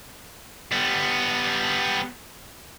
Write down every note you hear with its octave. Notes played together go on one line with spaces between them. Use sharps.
G3 B3